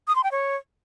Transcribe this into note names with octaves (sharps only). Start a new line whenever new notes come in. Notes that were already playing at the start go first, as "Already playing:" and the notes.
D#6
C6
G5
C#5